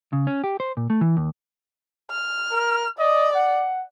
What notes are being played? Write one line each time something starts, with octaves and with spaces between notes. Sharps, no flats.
C#3
C#4
G4
C5
A#2
A3
E3
D#2
F6
A#4
D5 D#5
F#5